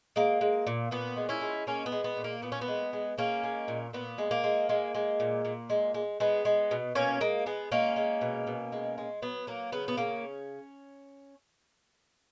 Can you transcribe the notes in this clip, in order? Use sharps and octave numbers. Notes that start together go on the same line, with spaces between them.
G#3 A#3
G#3
A#2
A#2 B3
G#3
C#4 E4
G#3
G#3 A#3 C#4
B3
G#3
B3
A#2
A#3
A#2 B3
C#4
B3
G#3
G#3
G#3 A#3 C#4
G#3
A#2
A#2 B3
G#3
A#3
G#3
G#3
G#3
A#2
A#2
G#3
G#3
G#3 B3
G#3
B2
B2 A#3 C#4
G#3 A#3
G#3 B3
G#3 A#3 C#4
G#3
B2
B2
G#3
G#3
F#3 B3
F#3 A#3
C#3 B3
B3
C#3 A#3 C#4